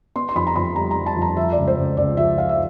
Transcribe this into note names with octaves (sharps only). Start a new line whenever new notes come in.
B3 C6
C6
F2 B5
A#5
F2 B5
G3 A#5
A#5
G3
A5
F2
A#5
F3 E5
D5
C#2
C5
C#2
C#2 D5
F3 E5
F3 F5
E5